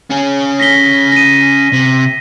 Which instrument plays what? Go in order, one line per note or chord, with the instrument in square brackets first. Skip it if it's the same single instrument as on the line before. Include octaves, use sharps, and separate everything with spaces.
[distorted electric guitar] C#4 G#4
[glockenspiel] A#6 B6 G7
A#6 D#7
[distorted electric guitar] C3